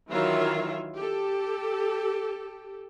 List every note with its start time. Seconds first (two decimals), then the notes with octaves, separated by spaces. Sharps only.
0.10 D#3 E3 F#3 F4 C#5 E5
0.96 G4 A4